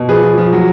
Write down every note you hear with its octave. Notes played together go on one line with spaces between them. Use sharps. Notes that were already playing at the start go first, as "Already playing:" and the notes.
Already playing: B2
F3 G#4 B4
F3
F3
F#3